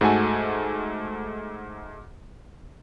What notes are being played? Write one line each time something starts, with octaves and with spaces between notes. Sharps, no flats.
G#2 A3 F#4 A4 G#5